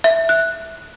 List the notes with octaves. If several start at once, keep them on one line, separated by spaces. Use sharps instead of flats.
E5
F#6